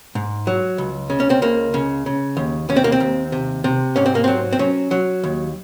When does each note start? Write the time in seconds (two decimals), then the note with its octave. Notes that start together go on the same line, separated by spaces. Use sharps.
0.15 G#2
0.47 F#3
0.78 C#2
1.10 C#3
1.20 C#4
1.30 C4
1.42 C#2 A#3
1.74 C#3
2.06 C#3
2.37 D#2
2.69 D#2 C#4
2.76 C4
2.84 A#3
2.92 C4
3.00 D#2
3.32 C3
3.64 C3
3.96 G#2 C#4
4.06 C4
4.15 A#3
4.24 F#3 C4
4.53 C4
4.59 F#3 C#4
4.91 F#3
5.24 D#2